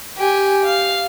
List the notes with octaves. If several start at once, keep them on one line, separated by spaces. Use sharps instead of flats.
G4 G#5
F5